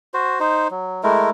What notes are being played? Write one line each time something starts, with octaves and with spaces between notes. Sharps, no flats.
F#4 C5
D#4 C5
F#3
G#3 A3 E4 A#4